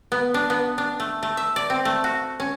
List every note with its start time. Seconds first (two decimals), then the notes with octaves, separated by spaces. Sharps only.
0.12 B3
0.34 D4
0.50 B3
0.78 D4
1.00 A3
1.23 A3
1.37 E5
1.56 D5
1.70 C4
1.85 A3
2.04 F#4
2.40 C#4